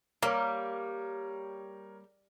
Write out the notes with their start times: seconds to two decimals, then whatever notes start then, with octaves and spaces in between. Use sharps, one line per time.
0.23 G3 A#3 A#4 C#5